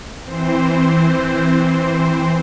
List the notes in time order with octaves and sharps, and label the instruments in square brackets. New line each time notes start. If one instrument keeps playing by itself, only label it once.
[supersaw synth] E3 C4 C5